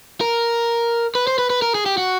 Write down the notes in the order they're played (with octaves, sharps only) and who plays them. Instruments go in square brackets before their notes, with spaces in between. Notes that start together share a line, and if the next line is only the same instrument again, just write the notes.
[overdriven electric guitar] A#4
B4
C5
B4
B4
A#4
G#4
G4
F#4